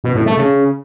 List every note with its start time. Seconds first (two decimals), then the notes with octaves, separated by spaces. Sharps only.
0.04 B2
0.15 A2
0.26 A3
0.37 C#3